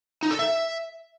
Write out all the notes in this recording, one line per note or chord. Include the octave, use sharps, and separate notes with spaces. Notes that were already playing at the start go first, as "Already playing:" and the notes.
D#4
A4
E5